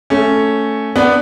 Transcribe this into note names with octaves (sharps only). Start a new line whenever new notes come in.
A3 C#4
B3 D4